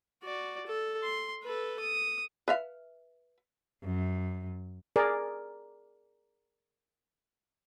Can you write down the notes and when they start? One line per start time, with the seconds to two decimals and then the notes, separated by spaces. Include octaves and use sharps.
0.24 F#4 D5
0.67 A4
1.03 C6
1.44 A4 B4
1.80 D#6
2.48 B4 E5 F5
3.83 F#2
4.96 G#4 A#4 D5